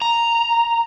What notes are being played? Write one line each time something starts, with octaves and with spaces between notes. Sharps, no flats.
A#5